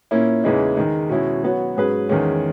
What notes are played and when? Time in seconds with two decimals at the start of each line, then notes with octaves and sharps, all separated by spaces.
0.11 A#2 A#3 C#4 E4
0.44 E2 C#3 E3 G#3 D#4
0.77 D#3 G#3 D#4
1.09 B2 G#3 C#4 E4
1.43 F#3 B3 F#4 C#5
1.76 G#2 F#3 C#4 G#4 B4
2.09 E2 D#3 G#3 C#4